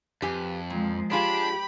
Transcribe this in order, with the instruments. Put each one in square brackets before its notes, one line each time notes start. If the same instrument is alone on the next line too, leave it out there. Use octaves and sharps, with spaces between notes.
[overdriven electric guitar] F2 [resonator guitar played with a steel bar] G4 B4 G#5
[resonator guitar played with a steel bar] A#2 [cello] F3 G#3
[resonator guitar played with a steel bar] G#3 F4 G#4 [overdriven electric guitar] D4 [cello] G4 [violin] B5